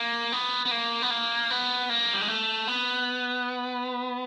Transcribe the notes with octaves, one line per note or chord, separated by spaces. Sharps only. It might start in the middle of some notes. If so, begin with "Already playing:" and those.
Already playing: A#3
B3
B3
A#3
B3
A#3
B3
A#3
G3
G#3
A3
B3